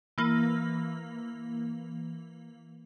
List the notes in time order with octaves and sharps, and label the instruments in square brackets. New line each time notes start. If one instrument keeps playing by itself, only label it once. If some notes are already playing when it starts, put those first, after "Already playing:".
[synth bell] E3 A#3